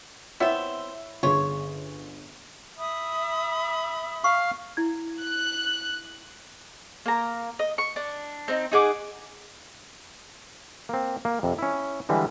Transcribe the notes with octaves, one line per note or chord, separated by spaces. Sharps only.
B3 C4 E4 C#5 E5 E6
G1 C#4 F4 G#4 C#5
E5 B5 D#6
F5 C#6
E4 G#6
F#6
A#3 A#5
D#5
C#6
D4
C4 D#4
D#4 G#4 F#5 D6
A#3 C4
A#3
F2 C3
C#4 E4
D3 E3 G3 G#3